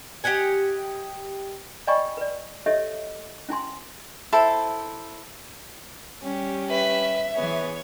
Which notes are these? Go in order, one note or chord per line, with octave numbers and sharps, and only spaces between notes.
G4 D#5 F#5 G#5
D5 D#5 G5 G#5 B5 C#6
B4 D5
G4 A4 C#5 D#5 E5
C#4 E4 G#5 C6
E4 A4 C5 A5
G3 C#4 G4
B4 E5
E3 B3 G#4 C#5